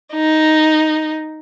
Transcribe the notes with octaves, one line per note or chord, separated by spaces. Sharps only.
D#4